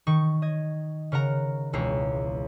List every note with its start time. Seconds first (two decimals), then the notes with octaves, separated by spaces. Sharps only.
0.07 D#3 C#6
0.42 D#5 G#6
1.12 C#3 A#4 F#5 A#5
1.73 E1 C#2 A#5 C7